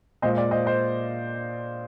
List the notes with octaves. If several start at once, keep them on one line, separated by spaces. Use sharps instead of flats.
A#2 G#3 C5 D#5
D5 F5
C5 D#5
C5 D#5